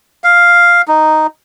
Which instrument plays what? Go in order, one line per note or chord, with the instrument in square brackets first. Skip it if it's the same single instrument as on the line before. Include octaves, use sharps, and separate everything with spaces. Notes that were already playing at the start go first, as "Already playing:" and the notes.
[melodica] F5
D#4